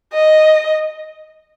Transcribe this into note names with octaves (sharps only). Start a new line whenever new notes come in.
D#5